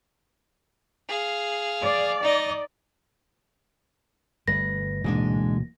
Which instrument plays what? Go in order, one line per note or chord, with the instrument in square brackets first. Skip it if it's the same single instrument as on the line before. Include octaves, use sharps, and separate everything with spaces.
[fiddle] G#4 F5
[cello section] D5
[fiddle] D#4 D#5
[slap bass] G1 G3 A3 [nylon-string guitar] B4 [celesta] A#6
[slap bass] D1 E3 A#3 [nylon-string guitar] G#2 G#3 D4 [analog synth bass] B2